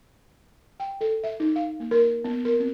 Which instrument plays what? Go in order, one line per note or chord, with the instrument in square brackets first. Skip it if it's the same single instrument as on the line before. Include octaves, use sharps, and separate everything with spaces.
[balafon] G5
A4
E5
D#4
F5
A#3
A#4
B3
A#4
C4